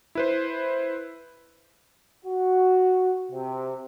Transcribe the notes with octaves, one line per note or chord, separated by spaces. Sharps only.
E4 B4 C5
F#4
C3